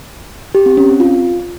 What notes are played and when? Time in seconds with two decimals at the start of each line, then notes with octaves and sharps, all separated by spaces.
0.55 G4
0.66 C4
0.77 C#4
0.89 C4
1.00 F4